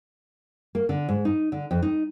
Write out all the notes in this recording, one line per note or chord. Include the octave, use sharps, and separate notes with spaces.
A#3
D3
G#2
D#4
D3
F2
D#4